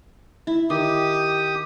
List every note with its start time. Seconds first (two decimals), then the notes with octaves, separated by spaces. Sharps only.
0.47 E4
0.70 D#3 G4 D#6